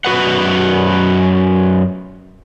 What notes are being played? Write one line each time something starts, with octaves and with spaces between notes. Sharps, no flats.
F#2 F#4 B4 F#5